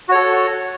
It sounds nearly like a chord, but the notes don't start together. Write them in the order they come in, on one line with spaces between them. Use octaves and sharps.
F#4 C#5 A4